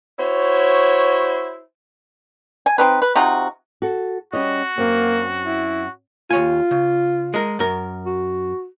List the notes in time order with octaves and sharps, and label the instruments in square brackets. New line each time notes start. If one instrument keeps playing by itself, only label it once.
[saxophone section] E4 F#4 C5 C#5
[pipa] G#5
C4 D#4 B4
B4
C3 D#4 F4 F#4
[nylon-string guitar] F#4 A4
[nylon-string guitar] G3 C#4 D#5 [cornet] F#4
[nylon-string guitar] F#2 C4 [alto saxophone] A#3
[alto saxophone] E4
[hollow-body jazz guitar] D#2 C#5 G#5 [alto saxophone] F4
[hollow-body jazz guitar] C#3
G#3 A#4
F#2 A#4
[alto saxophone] F#4